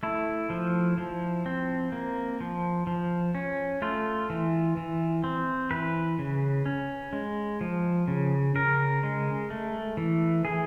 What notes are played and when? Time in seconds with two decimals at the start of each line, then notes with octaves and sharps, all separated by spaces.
0.03 A3 E4
0.50 F3
0.98 F3
1.46 C4
1.92 A#3
2.40 F3
2.87 F3
3.35 C#4
3.82 A3 F4
4.30 E3
4.77 E3
5.24 C4
5.71 E3 B4
6.19 C#3
6.66 C#4
7.13 G#3
7.61 F3
8.08 C#3
8.55 C#3 A#4
9.03 G#3
9.50 A3
9.97 E3
10.45 E3 G#4